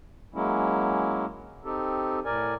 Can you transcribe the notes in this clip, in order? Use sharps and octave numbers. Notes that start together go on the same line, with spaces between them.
F#3 G#3 A#3 C#4 E4
C4 D#4 G4 A4
A2 A#4 D5 G#5